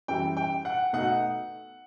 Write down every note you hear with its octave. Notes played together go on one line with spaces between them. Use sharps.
F#2 E3 G3 G5
G5
F#5
B2 A3 D#4 F#5